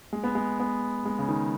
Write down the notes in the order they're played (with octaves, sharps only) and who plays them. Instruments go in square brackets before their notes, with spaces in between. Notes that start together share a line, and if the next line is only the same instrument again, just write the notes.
[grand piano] G#3
B3
G#3
B3
G#3
C#3
D#3